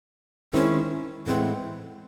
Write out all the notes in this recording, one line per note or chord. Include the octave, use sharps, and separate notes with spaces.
D#3 G#3 C4 C#4 E4
A2 E3 G#3 B3 C4